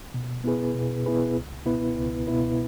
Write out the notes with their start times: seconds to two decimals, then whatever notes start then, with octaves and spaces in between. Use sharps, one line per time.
0.14 B2
0.44 B3 E4 G#4 B4
0.75 B2
1.06 B3 E4 G#4 B4
1.37 C#2
1.66 B2 B3 E4 B4
1.97 C#2
2.27 B2 B3 E4 B4